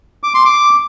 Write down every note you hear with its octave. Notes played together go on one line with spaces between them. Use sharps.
D6
C6
D6